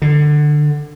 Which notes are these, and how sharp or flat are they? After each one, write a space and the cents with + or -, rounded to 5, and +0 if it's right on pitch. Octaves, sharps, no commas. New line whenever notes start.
D3 +20